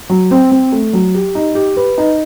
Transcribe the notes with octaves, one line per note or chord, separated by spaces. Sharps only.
F#3
C4
C4
A3
F#3
G4
D#4
G4
B4
D#4